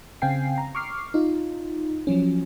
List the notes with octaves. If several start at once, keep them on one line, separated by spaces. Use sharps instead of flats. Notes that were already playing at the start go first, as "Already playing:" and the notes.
C#3 C4 F5 G5 G#5 C7
A#5
C#6 D6 F6 C7
D#4 F4
F3 F#3 C#4